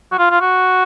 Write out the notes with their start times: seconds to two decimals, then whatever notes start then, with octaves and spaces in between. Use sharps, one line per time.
0.12 F#4
0.19 F4
0.31 F4
0.41 F#4